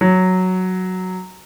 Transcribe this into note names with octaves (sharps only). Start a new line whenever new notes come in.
F#3